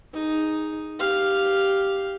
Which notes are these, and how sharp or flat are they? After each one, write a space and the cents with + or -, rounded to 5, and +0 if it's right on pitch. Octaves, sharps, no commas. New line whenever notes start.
D#4 +0 G#4 +0
G4 +0 F5 +0